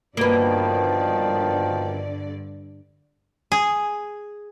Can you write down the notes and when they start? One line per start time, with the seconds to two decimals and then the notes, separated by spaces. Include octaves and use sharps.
0.17 G2 B2 D3 D#3 F3 A#3 B4 D5
3.52 G#4